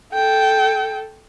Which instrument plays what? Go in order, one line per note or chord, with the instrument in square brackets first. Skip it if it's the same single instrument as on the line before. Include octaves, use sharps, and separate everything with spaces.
[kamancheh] A4 G5